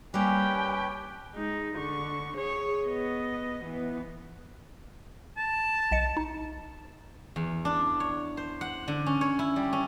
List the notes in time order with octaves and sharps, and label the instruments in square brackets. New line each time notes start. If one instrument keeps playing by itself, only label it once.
[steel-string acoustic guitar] G3 A#3 [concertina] C#4 G4 B4 [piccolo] G5 [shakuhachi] G#5
[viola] G#3 D#4
D3 C#6
G#4 C#5
B3 D#5
E3 B3
[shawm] A5
[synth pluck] B1 D#5 C#7
D#4
[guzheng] E2
D4
C#5
C5
F#5
D3
C#4
C#5
E4
G3
C#4